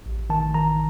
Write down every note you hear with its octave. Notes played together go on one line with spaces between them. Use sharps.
A1
D#3 A5
D#3 A#5